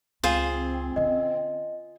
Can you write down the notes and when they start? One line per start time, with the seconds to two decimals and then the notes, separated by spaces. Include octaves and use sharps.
0.24 C#2 C4 F4 G#4 C5
0.96 D3 C#4 D#5